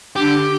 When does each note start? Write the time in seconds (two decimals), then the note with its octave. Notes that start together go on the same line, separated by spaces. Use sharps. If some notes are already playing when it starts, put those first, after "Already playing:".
0.16 D3 G4